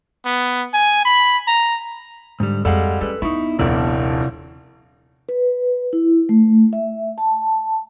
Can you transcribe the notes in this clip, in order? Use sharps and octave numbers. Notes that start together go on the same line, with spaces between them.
B3
G#5
B5
A#5
G#2 D3 G3
F2 G3 G#3 A4 F5 F#5
C#4 A4 B4
B3 D#4 E4 C#6
D#1 A#1 C3 E4 D5
B4
E4
A3
E5
A5